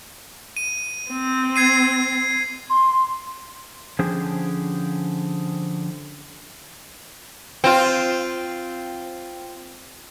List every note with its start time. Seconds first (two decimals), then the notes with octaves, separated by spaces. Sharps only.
0.57 D#7
1.12 C4
1.56 G#6 C7 D#7
2.70 C6
3.99 D3 F3 C#4 G4 G#4 C5
7.64 C4 F4